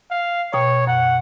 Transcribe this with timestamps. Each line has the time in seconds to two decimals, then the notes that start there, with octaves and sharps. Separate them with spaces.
0.11 F5
0.53 B2 C#5 G5 A#5
0.87 F#2 F#5